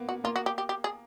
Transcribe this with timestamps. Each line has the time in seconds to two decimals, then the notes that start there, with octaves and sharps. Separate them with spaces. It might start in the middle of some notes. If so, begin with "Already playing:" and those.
Already playing: A#3 B3
0.09 F#4
0.24 A#3 F4
0.36 F#4
0.46 G4
0.58 G4
0.69 G4
0.84 G#4